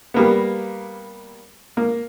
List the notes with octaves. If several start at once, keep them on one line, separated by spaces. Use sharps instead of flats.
G3 A#3 B3
A#3